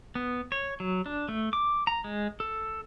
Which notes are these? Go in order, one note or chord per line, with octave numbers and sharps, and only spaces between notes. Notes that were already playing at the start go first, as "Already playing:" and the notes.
B3
C#5
F#3
D4
A3
D6
A#5
G#3
A4